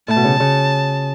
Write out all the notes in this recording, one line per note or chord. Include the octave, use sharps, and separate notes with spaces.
A2 A5
B2
C#3
C#3